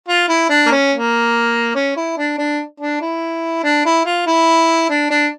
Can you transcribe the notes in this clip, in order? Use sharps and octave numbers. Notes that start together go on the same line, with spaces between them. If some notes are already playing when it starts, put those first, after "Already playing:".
F4
E4
D4
A#3
C#4
A#3
C#4
E4
D4
D4
D4
E4
D4
E4
F4
E4
D4
D4